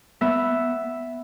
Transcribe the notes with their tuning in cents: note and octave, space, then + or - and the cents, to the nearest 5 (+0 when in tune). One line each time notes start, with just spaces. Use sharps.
B3 +0 E5 +0